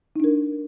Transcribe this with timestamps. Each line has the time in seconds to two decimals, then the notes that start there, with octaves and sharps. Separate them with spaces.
0.16 D#4
0.20 D4
0.24 A#4